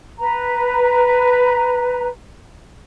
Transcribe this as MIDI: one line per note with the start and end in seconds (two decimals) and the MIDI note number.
0.18 2.07 71
0.18 2.07 82